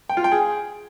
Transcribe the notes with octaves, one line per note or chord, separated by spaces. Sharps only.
G5
F4
G5
G#4